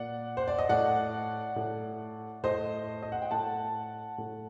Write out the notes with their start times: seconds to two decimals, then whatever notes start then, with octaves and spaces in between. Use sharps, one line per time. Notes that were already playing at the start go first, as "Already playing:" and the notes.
Already playing: A#2 D5 F#5
0.37 C5
0.48 D5
0.58 D#5
0.69 A2 D5 F#5
1.56 A2
2.43 A2 C5 D#5
3.02 D#5
3.12 F#5
3.22 G5
3.31 A2 F#5 A5
4.18 A2